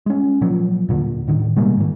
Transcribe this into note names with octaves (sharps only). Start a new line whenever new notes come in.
G#3 C#4
A#2 F3 F#3
D#2 A#2 D3
A2 D3 D#3
B2 G3 G#3 A#3
G#2 D#3